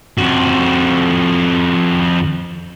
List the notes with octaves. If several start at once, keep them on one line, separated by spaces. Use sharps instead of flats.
F2 F#4